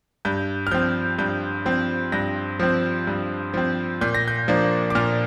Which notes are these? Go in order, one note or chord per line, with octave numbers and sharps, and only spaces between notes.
G2 G6
F6
F3 C4 G6
G2 G6
F3 C4
G2 A#6
F3 C4
G2
F3 C4
A#2 G6
A#6
G6
F3 A#3 D4
D6
A#2 F6